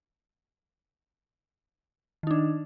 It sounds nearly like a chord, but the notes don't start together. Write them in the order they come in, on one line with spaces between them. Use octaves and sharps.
D#3 D#4 D4